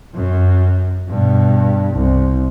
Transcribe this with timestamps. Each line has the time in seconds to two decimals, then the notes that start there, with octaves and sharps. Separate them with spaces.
0.15 F#2
1.09 G2 B2
1.94 C2